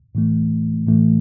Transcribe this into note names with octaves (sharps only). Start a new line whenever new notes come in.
A2 E3 A3
A2 E3 A3